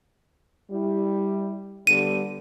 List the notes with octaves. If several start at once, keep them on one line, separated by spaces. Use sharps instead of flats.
G3 E4
D3 G3 B3 D#7